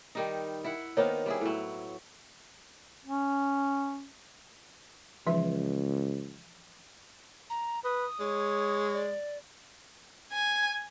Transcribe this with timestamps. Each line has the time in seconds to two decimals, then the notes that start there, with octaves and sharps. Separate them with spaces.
0.15 D#3 G3 D#4
0.64 E4 F#5
0.97 D#3 A#3 B3 C5 C#5
1.26 G3 E4 G#4
1.41 A2 F#3
3.05 C#4
5.26 C#2 E3 F3 E5
7.50 A#5
7.84 B4 D#6
8.20 G#3 C#5
8.94 D5
10.34 G#5